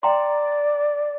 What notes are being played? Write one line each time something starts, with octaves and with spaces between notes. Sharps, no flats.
D5 G5 A#5 C6